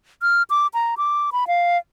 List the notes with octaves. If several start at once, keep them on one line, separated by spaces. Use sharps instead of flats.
F6
D6
A#5
D6
B5
F5